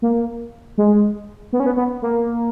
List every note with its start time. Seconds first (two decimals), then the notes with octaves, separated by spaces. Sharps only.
0.02 A#3
0.78 G#3
1.53 B3
1.60 C#4
1.66 B3
1.77 B3
2.02 A#3